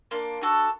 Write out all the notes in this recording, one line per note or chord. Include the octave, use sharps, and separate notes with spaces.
A#3 D4 F4
D4 F#4 A4